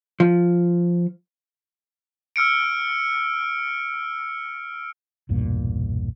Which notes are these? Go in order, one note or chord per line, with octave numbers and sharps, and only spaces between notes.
F3
E6 F6 C#7 D7
B1 E2 G2 A#2